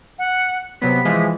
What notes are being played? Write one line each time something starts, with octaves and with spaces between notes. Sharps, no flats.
F#5
C3 F#3 B3 B6
E3 F3 G#3